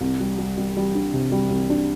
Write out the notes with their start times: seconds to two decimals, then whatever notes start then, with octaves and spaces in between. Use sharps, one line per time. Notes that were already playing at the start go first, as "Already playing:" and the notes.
0.01 C2
0.20 G3
0.38 G3
0.58 G3
0.76 G3
0.95 D4
1.14 C3
1.32 G3
1.50 C2
1.70 D4